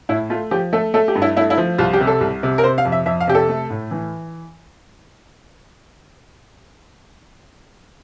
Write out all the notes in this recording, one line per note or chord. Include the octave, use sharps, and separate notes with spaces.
A2 E4
A3 F4
F3 G4
A3 A4
A3 A4
G4
G2
E4
A3 E4
E4
F3
C2 F4
G4
C3
A4
C2
C3
A#4
C3 C5
F5
F2
E5
F2 E5
F5
C3 G4
A4
A3
A2
E3